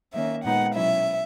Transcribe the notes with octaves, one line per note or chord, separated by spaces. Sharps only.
D#3 A#3 C#4 E5
A#2 G#3 B3 D#4 F#5
B2 F#3 C#4 E4 E5